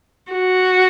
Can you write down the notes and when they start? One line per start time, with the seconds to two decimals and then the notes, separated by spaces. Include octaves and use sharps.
0.32 F#4